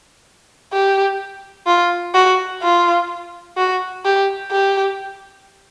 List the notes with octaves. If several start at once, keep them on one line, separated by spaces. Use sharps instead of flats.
G4
F4
F#4
F4
F#4
G4
G4